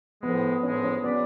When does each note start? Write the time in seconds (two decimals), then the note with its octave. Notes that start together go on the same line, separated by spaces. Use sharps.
0.22 A2 F3 G#3 B3
0.63 A2 F3 G#3 C#4
0.84 C#4
1.04 F#3 B3 C#4 G#4 B4 D5